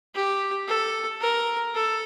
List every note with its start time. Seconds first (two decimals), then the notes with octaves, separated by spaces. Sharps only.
0.15 G4
0.68 A4
1.21 A#4
1.75 A4